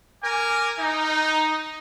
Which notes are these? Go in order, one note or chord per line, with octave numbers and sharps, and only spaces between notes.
A#4 G#5 D6
D#4